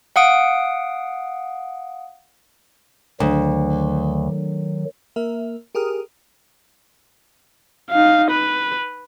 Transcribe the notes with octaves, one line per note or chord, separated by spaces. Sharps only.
F5 F#5 D#6 D7
D2 D#3 F#3
A#3 A#4 E5
G4 G#4 A#4 D#6 F6
D#4 F5
B4